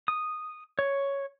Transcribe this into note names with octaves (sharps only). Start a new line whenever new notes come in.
D#6
C#5